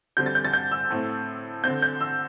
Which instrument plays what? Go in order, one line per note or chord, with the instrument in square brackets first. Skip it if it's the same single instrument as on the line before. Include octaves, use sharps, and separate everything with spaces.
[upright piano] D3 G3 C4 G6
A6
G6
A6
G6
E6
A2 A3 C4
D3 C4 G6
G6
E6